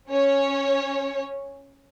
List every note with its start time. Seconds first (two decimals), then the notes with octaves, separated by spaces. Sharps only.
0.10 C#4 C#5